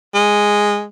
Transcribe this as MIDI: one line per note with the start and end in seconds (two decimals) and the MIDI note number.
0.14 0.84 56